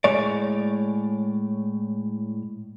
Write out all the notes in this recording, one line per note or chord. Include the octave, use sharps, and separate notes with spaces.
A2 G#3 C#5 D5